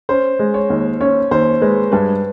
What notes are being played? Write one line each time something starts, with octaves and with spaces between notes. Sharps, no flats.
C#4 C5
G#3
C#5
D#2
C#4 C#5
D#2 C5
G#3 B4
G2 B4